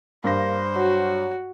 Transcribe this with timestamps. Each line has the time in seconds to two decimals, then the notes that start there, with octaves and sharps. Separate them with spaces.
0.24 G2 A#3 C5 A#6
0.76 F#3 F#4